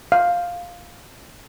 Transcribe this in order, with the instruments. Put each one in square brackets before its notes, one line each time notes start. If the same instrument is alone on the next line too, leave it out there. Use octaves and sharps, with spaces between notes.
[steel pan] F5